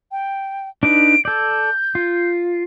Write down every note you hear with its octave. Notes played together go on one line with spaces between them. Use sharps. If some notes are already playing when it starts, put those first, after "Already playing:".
G5
D4 D#4 B4 D7
A4 D5 G6
F4